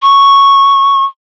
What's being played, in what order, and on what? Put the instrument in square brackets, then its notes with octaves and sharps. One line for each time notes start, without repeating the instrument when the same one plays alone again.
[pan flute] C#6